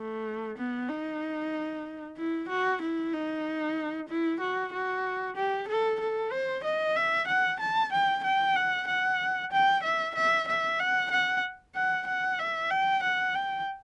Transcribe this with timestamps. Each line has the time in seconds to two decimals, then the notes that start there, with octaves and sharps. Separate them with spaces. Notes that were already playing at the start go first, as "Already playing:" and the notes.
Already playing: A3
0.57 B3
0.89 D#4
2.17 E4
2.49 F#4
2.82 E4
3.13 D#4
4.09 E4
4.40 F#4
4.73 F#4
5.36 G4
5.68 A4
6.00 A4
6.32 C5
6.64 D#5
6.96 E5
7.28 F#5
7.60 A5
7.92 G5
8.24 G5
8.56 F#5
8.87 F#5
9.52 G5
9.83 E5
10.15 E5
10.48 E5
10.80 F#5
11.11 F#5
11.75 F#5
12.07 F#5
12.39 E5
12.71 G5
13.03 F#5
13.35 G5